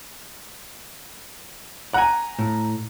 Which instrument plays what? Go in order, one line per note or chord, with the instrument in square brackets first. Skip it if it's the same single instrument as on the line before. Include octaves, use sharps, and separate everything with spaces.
[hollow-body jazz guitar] F#5 G#5 [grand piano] A#5
[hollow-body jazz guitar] A2